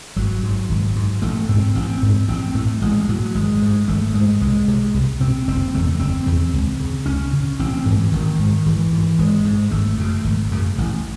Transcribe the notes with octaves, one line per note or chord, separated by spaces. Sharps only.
G#1 F#3
G#2
G#1
G#2
A1 A3
G#2 C4
A1 C4
G#2
A1 C4
A2 A3
A1 G#3
A2 F#3
G#1 G#3
G#2
G#1 A3
G#2 G#3
C2 G#3
C3
C2
C3 C4
F#1 C4
E2 C#3 A3
F#1 C4
E2 C#3
C#2
C#3
C#2 C#4
C#3
A1 C4
G#2 E3
A1 D#3
G#2
G#1 E3
G#2
G#1 G#3
G#2
G#1 A3
F#2 C#3
G#1
F#2 C#3
A1